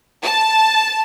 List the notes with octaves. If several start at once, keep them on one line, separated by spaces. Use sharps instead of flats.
A5